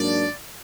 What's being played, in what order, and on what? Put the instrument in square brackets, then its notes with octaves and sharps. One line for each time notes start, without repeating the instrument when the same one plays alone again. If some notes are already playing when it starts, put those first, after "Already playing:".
Already playing: [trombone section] G#2 F#3 A#3 D4 [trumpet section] D5